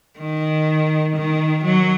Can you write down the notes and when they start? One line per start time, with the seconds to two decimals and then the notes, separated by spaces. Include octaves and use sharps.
0.19 D#3
1.16 D#3
1.64 F#3